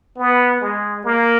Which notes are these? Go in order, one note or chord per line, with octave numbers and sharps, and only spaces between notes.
B3
G#3
A#3